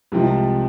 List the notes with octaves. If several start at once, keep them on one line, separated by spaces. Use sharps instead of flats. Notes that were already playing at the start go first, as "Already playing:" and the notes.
C2 C3 F3 G#3